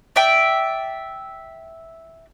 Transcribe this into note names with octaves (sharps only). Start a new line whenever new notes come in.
D5 E5 G5